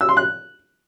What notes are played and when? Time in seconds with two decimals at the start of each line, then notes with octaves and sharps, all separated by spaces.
0.01 E6
0.09 C6
0.17 F#6